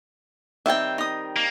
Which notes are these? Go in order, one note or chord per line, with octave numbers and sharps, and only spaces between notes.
D#3 G3 C4 E5 G5
D#4 D#6
A#3